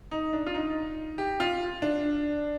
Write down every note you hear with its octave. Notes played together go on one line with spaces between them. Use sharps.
D#4
D4
F4
D#4
G4
F4
D4